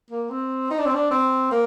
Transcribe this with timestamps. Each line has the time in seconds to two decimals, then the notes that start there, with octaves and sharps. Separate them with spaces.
0.11 A#3
0.30 C4
0.71 D#4
0.78 D4
0.86 C4
0.94 D4
1.11 C4
1.51 A#3